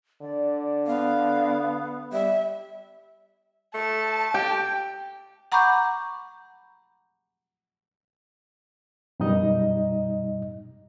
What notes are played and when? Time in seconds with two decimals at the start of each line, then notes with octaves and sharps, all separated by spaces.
0.21 D3 D5
0.87 B3 F5
2.13 G3 E5
3.74 A3 A5
4.34 G4 G5
5.52 F#5 A#5 B5 C#6 D6 G6
9.20 F#2 B2 G3 D#4 D#5